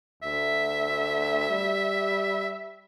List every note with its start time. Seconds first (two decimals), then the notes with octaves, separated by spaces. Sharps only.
0.22 D2 E5
1.50 G3